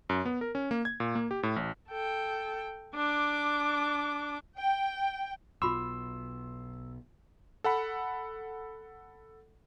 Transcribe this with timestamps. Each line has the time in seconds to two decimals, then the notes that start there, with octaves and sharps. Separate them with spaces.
0.09 F#2
0.25 B3
0.41 A#4
0.55 C#4
0.71 A#3
0.85 G#6
1.00 A#2
1.15 A#3
1.31 G4
1.43 A2
1.56 A1
1.90 A4 G5
2.96 D4 D6
4.57 G5
5.62 B1 B2 F4 B5 C6 D6 E6
7.64 A4 F#5 B5